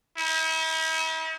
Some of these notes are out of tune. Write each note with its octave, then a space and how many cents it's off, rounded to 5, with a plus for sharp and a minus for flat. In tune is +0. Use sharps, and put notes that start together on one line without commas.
E4 -45